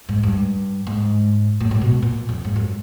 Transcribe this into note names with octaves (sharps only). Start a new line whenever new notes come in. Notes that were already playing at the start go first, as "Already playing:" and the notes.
G#2
G2
G#2
A2
A2
B2
A#2
F2
G#2
F#2